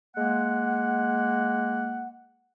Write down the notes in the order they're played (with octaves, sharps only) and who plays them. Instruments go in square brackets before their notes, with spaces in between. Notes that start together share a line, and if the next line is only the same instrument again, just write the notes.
[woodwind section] G#3 A#3 F#5